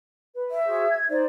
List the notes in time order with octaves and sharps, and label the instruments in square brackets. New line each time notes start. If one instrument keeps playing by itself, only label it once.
[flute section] B4
[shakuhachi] E5
[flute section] F#4 G#4 C5
G#6
[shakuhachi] D#4 [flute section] C5 D5